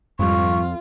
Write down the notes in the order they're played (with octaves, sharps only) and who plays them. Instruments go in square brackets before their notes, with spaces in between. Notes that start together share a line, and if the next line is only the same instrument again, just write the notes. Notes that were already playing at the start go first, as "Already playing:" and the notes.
[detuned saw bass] F2 [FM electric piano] G#2 G3 [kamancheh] F4 [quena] C#6